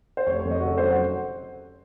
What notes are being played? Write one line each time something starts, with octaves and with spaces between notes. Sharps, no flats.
C5
F1 C#5
C#5
F2
D#5
F#4
C#3 A4
C5
F#3
F#5